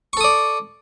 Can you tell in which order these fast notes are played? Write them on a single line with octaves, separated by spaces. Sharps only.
C#6 A4 D#6 D5